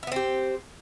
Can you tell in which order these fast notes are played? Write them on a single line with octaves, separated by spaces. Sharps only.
E4 B3 C4 G4